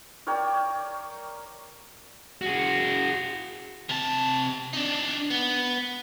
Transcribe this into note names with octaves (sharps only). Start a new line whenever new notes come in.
A#4 C#5 D5 G5
F#4 G#4
C3 A5
D4 D#4
B3